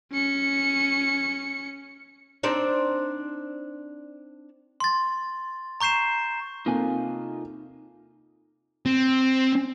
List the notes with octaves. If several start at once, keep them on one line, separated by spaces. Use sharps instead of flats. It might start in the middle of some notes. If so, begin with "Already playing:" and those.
C#4 C#7
C4 D4 D#4
C6 A6
A#5 C#6 G6 C7 E7
C3 A#3 D#4 F4 A4 G#5
C4